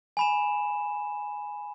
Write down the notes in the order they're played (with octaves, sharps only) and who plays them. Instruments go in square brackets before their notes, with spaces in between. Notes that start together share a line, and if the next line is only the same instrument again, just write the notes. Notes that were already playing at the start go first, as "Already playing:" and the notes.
[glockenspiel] G#5 B5 E7